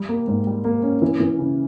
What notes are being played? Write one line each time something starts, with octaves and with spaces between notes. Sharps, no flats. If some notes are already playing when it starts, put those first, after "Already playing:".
Already playing: G3
A#3
G#2
G3
A#3
C#4
E3
E3
C#3